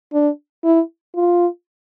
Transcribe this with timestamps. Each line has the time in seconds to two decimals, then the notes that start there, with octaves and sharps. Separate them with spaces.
0.14 D4
0.64 E4
1.16 F4